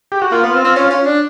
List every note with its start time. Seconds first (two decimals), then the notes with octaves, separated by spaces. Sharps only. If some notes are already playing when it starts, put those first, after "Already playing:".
0.12 G4
0.22 F#4
0.32 A#3 F4
0.43 B3
0.54 C4
0.65 C4
0.76 C#4
0.91 C#4
1.06 D4